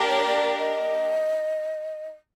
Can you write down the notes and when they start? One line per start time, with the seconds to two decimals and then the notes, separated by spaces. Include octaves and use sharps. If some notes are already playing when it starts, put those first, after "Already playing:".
Already playing: A#3 D4 G4 A#4
0.08 C#5
0.25 D5
0.58 D#5